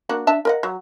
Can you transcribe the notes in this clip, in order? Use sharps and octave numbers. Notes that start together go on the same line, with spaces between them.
A#3 D4 F#4
D4 E5 A5
A#4 D#5 F#5
F#3